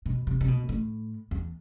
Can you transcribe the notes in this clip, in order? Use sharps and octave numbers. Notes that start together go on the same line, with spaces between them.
B2
C3
C3
B2
A2
E2